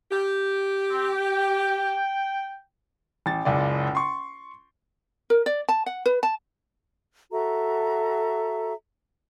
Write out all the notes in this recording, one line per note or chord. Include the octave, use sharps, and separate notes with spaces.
G4
C4
G5
A1 A6
F#1 C#2 D5
C6 C#6
A#4
D5
A5
F#5
B4
A5
F#4 A4 E5 A#5